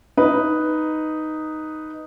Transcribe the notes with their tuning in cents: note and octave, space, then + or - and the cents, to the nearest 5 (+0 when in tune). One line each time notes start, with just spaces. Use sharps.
D#4 +0 B4 +0